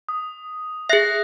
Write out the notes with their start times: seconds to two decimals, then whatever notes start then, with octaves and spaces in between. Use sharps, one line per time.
0.09 D#6
0.89 G#4 E5 F#6 A#6 C7